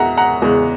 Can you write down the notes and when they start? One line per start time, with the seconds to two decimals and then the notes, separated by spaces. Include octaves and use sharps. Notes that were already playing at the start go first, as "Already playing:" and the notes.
Already playing: E2 G#3 E5 F#5 A#5
0.17 F#5 A#5
0.42 E2 C#3 G#3